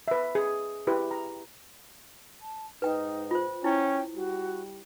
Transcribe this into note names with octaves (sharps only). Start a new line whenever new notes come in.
B4 E5
G#4
E4 G4 B4
A#5
A5
G#2 D#4 B4 G5
F4 C5
C#4 E4 G5
G3 F#4